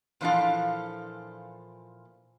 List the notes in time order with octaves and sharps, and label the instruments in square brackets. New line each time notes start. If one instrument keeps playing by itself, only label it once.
[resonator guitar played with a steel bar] A#2 E3 F3 D4 A4 F5